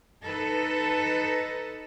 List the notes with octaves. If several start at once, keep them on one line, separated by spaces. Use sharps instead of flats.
D#4 A4 B4